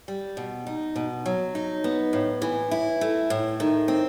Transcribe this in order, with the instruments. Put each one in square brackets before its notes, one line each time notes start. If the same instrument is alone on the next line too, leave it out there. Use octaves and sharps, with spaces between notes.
[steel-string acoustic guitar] G3
B2
D#4
B2
F#3
D#4
B3
A2
E3
E4
A3
A2
D#3
C4